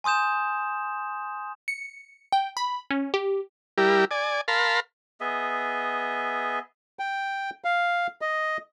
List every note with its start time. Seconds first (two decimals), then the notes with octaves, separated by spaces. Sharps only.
0.04 G#5 C6 D#6 G6 E7
1.68 C#7
2.32 G5
2.57 B5
2.91 C#4
3.14 G4
3.78 G3 E4 G4 A#4
4.11 D5 G#5
4.48 A#4 F5 A5 B5 C6
5.21 B3 G#4 D#5 E5
6.99 G5
7.64 F5
8.21 D#5